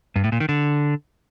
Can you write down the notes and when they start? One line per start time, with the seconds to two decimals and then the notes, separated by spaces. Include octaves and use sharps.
0.16 G2
0.24 A2
0.32 A#2
0.40 D#3
0.49 D3